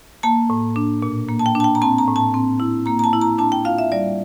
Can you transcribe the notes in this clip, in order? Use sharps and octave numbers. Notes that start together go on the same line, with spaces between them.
A#3 A5
A2
D4
A#2
A#3
A5
G5
D4 A5
G5
A#5
C4 A5
A#5
A2
A5
C4
E4
A#3 A#5
A#5
A5
E4
A#5
D4 A5
G5
F4 F5
E5
G3 D5